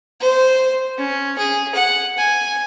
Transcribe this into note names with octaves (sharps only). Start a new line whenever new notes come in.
C5
C#4
G#4
F#5
G#5